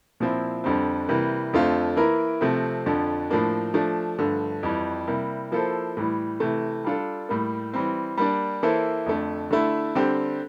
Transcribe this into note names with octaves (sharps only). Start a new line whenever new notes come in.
A#2 F3 C4 E4
F2 D3 G3 C4
C3 E3 G3 A#3
F2 D3 A3 C4 F4
E3 A#3 E4 A#4
C3 F3 A3 C4
F2 D3 F3
A2 F3 A#3 D4
F3 A3 D4
G2 D3 F3 A3
F2 E3 G3
C3 G3 A#3 E4
F3 A#3 E4 A4 C5
A2 E3 G3
C3 E3 A3
G3 D4 F4 A4
A2 G3 A#3
E3 G3 C4
G3 A#3 D4
E3 A#3 E4 A4 C5
F2 D3 A3
D3 A3 E4
D3 G3 C4 G4